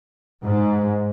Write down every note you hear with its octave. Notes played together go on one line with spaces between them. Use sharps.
G#2